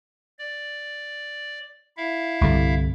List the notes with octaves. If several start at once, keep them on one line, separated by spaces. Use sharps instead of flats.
D5
E4 E5 F5
C2 G2 D3